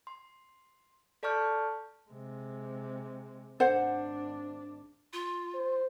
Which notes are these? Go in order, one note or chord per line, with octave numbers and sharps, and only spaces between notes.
C6
A4 D5 A5 C#6 F6 G6
C3 G#3
G#1 D4 C5 F#5
F4
C5